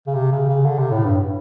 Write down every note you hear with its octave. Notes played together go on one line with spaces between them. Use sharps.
C#3
C3
C#3
C#3
D3
C3
A2
G2